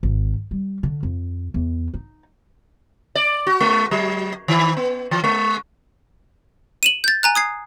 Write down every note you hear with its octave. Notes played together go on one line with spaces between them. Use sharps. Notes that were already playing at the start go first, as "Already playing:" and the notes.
G#1
G3
D3
F2
E2
D#4
D5
F#4
G#3
F#3
D#3
B3
E3
G#3
D#7 E7 F#7
G6 A6
G#5 A#5 F#6
D#6 G#6 C7